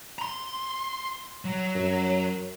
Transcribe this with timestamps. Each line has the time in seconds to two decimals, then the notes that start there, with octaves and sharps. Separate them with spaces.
0.19 A#5 C6
1.45 F#3
1.75 F#2